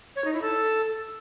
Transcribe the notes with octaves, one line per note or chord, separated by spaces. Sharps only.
C#5
D#4
E4
A4